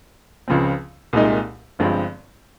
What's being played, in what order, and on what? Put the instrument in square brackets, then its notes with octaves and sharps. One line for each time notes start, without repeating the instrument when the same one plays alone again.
[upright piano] C#2 C#3 F3 C4
C2 A#2 G#3 D#4
G1 G2 F3 G#3 C4